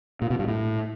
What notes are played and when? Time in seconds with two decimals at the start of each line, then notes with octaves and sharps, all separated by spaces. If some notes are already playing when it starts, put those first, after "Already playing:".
0.22 A#2
0.30 B2
0.39 G2
0.48 A2